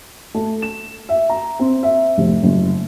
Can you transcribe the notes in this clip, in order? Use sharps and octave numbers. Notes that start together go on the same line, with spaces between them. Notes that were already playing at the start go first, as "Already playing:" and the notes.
A3
E7
E5
A#5
C4
E5
F1
F#1